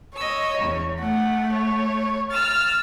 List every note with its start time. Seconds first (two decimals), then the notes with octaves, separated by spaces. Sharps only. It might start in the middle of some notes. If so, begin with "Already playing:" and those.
0.16 C#5 D#5 E6
0.58 E2
1.01 A3 F#5
1.55 C#5
2.31 E6 F6 A6